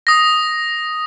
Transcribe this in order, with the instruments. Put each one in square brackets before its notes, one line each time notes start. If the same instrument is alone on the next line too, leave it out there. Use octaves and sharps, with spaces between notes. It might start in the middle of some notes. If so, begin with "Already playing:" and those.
[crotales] D#6 A#6